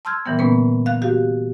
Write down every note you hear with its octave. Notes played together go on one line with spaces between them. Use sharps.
A5 C6 E6 F6 G6 G#6
A#2 D3 E3 G3 B3
A#2 A#3 B3 C#4 B4
F5 F#6
F#4 G4 F5